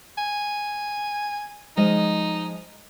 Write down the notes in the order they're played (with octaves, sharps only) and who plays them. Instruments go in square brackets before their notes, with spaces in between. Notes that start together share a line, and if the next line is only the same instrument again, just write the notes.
[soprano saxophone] G#5
[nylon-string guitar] F3 G#3 D#5 [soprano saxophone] D#4